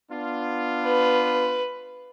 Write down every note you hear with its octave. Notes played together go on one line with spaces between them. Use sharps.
B3 D4 F4
B4